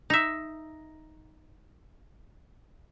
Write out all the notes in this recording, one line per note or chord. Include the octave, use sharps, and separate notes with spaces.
D#4 E5